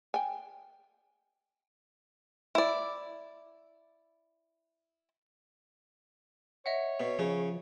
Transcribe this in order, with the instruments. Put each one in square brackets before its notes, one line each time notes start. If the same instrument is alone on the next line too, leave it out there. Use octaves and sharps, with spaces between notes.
[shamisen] G5 G#5
[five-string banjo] E4 D5
[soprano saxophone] C#5 [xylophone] D#5 E5 F#5
[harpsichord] B2
[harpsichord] C#3 [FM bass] F3